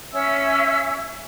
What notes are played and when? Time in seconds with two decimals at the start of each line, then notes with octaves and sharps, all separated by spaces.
0.13 C#4 E5 E6